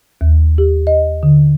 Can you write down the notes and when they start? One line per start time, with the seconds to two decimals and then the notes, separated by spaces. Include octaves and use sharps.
0.21 D#2
0.58 G4
0.87 D#5
1.23 D3